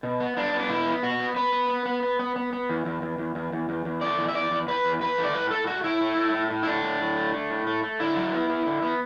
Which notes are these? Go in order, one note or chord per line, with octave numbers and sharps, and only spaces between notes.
B2
B3
B3 D4
B3
D4
B2 E4
B3
B2 F#4
B3
B3 B4
B3
B3
B3
B3
B3
B3
B3
E2
E2
E2
E2
E2
E2
E2
E2
A3 D5
E2
E5
E2 D5
E2
E2 B4
E2
E2 B4
A3
D5
A2 B4
A3 A4
A3 F#4
A3 E4
A3
A3
A2
A2
E4
A3 D4
A2
A2
A3
A3
A2
A3
A3
D3 E4
F#3
B3
B3
D3
B3